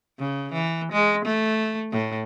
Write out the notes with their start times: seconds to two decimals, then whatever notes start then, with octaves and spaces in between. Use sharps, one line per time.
0.19 C#3
0.53 E3
0.92 G#3
1.25 A3
1.92 A2